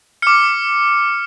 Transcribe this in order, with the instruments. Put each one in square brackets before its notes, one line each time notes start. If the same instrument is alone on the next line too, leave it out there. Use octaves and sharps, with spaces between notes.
[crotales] D6 F6 C#7